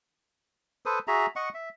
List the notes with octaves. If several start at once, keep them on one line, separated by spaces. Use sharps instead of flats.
A4 B4 C5 D#6
F#4 G#4 E5 A#5
D#5 F#5 C#6
E5